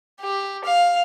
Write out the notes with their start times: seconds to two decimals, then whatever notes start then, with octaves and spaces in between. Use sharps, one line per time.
0.21 G4
0.65 F5